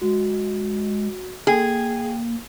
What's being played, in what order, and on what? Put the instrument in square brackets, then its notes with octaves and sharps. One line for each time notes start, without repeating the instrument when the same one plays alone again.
[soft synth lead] G#3 [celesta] F#4
[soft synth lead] A#3 [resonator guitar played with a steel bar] G#4 [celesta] G5